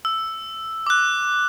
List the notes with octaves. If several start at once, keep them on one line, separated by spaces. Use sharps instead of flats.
E6
D6 F#6